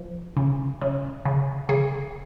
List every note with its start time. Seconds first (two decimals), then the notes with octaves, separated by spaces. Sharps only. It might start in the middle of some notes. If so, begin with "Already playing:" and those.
Already playing: F3
0.37 C#3
0.81 C#3
1.25 C#3
1.69 C#3 G#4